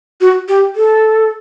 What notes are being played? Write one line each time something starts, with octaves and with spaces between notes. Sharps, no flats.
F#4
G4
A4